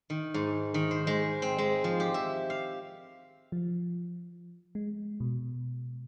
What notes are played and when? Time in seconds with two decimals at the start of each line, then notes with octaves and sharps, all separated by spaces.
0.10 D#3
0.34 G#2
0.74 D#3
0.91 C5
1.07 G#3
1.42 C4
1.58 G#3
1.84 F3
2.00 G4
2.14 E5
2.50 F5
3.52 F3
4.75 G#3
5.20 B2